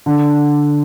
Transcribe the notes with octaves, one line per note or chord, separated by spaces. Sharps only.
D3